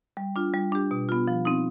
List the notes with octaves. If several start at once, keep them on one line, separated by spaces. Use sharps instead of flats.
G3
D4 F4
G3
D4 G4
B2
B3 F4
F3
C4 D#4